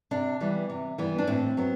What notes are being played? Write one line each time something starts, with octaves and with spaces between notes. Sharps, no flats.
C3 D4
E3 G3 B3
C3
E3 G3 B3
D4
A2 C4
F#3 B3